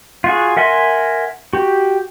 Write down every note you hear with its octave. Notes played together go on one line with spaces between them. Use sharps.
F4 F#4 G#4
A#4 E5 F#5 G#5 C6
F#4 G4